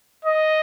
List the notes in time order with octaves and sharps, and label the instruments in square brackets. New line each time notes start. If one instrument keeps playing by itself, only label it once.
[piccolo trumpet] D#5